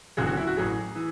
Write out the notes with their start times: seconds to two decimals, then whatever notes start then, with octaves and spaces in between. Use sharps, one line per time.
0.17 F#1 E2 D3 F#3 G#4
0.27 F#4
0.37 E4
0.47 F#4
0.57 A1 A2 F#3 G#4
0.95 E3